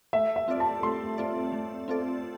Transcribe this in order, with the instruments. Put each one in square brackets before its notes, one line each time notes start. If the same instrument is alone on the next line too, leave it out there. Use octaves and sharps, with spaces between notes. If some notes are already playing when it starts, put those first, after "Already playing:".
[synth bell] A3 [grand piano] E5
[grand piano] E5
[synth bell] C4 F4 A4 D5
[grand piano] A5
[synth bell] A3 [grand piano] C6
[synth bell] C4 F4 A4 D5
A3
C4 F4 A4 D5